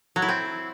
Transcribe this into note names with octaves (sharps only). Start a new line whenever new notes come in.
F#3
E4
C4